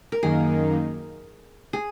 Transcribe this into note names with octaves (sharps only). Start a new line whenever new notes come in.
A#4
F#2 D#3 A#3 D#4 G#4
G#4